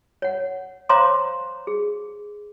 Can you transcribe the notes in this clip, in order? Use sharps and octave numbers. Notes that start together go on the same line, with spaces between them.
C#5 F#5
C5 C#5 F5 A#5 C6 D6
G#4